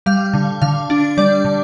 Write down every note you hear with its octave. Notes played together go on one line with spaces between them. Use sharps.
G3 F5
D3
D3 F5
D4
G3 D5
D3